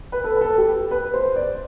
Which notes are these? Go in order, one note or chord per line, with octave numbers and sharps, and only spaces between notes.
B4
A4
B4
A4
G4
B4
C5
D5